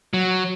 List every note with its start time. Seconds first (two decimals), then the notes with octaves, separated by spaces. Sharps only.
0.13 F#3